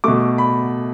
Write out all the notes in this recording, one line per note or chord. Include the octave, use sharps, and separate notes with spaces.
B2 A3 D6
B5